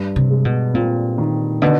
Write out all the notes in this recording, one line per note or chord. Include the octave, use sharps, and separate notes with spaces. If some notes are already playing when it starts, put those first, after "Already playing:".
Already playing: G2
C3
G#3
B2
A#2 C4
D#3
B2 D3